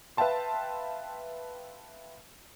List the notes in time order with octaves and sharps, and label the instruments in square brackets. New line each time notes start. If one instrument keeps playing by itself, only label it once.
[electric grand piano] B4 E5 F5 G5 A5 C6